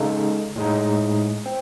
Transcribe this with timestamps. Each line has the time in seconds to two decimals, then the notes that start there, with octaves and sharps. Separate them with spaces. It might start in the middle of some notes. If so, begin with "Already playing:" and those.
Already playing: C#3 G#3 D#4 A4
0.56 A2 G#3 D#4
1.46 C4